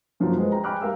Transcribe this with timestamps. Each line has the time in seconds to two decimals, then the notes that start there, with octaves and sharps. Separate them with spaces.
0.20 F#2 F3 F#3 A#3
0.38 G#3 B4 C5
0.52 G5 A#5
0.64 G5 G#5 B5 D6 F6 F#6
0.82 G3 A#4 F5 E6